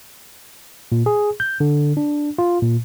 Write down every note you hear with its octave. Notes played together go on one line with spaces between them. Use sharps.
A#2
G#4
G6
D3
D4
F4
A#2